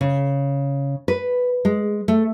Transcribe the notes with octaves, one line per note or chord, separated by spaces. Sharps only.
C#3
B4
G#3
A3